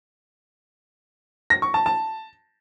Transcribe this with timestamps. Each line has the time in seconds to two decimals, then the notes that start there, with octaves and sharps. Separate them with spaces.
1.50 A#6
1.62 C#6
1.74 A5
1.86 A5